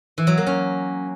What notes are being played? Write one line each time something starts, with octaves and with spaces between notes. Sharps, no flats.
E3
F#3
A#3
C#4